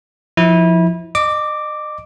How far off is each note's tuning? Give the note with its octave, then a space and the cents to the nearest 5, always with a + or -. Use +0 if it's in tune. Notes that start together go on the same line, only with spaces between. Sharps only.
F3 +0 E4 -25
D#5 -35 D6 +0